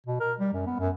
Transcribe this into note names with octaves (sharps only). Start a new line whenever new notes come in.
B2
A#4
G3
F#2
B3
F#2